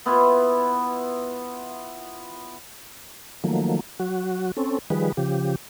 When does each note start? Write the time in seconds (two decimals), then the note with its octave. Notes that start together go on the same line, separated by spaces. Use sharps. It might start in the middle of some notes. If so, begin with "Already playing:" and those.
0.06 B3 E4 F4
3.44 D#3 F3 F#3 A3 A#3
4.00 F#3 F#4
4.57 C4 C#4 A4
4.90 D#3 F3 G3 G#4 B4
5.17 C#3 F3 G4